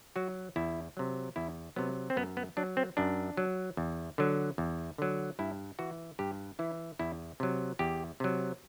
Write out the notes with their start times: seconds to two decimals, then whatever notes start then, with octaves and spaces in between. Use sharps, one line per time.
0.16 F#3 F#4
0.56 E2 E4
0.97 C3 F#3
1.36 E2 E4
1.76 C3 F#3 B3
2.10 C4
2.16 F#2 B3
2.37 B3
2.57 F#3 D4
2.77 C4
2.97 F#2 D4
3.37 F#3
3.77 E2
4.18 D3 F#3
4.58 E2
4.98 D3 F#3
5.39 G2 E4
5.79 E3 F#4
6.19 G2 G4
6.59 E3 E4
6.99 E2 E4
7.40 C3 F#3
7.79 E2 G4
8.20 C3 F#3